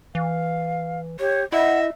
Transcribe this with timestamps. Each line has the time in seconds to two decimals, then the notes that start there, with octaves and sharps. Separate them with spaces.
0.15 E3 F5
1.20 G4 C#5
1.52 E4 D#5 E5 F#5